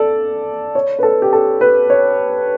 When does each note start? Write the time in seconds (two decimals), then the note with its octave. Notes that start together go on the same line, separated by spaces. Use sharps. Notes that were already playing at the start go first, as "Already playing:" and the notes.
Already playing: A4 D5
0.75 C#5
0.99 B4
1.03 A4
1.22 G4
1.33 A4
1.61 B4
1.90 C#5